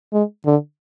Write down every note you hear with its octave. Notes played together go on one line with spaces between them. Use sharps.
G#3
D3